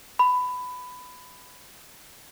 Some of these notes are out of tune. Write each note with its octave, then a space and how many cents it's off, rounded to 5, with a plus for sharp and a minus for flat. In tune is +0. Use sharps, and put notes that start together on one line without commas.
B5 +15